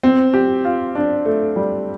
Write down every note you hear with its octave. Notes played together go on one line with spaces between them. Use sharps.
C4
G4
F4
D4
A3
G3